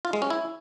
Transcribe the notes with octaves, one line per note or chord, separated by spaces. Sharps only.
F4
G#3
C#4
E4